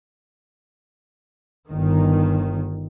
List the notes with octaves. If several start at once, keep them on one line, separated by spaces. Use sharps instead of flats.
G1 D#3